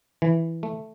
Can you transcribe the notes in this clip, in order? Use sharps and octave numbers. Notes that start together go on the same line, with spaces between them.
E3
A3